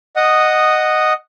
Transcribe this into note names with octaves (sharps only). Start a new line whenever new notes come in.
D#5 F#5 D#6